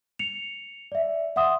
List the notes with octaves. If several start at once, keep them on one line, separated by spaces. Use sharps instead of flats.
C#7 F7
D5 E5
E5 F#5 C6 D#6